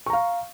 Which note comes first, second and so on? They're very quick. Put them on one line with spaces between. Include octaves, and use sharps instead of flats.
C#6 A#5 F5